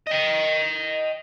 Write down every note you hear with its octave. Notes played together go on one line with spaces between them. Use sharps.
D#5 G5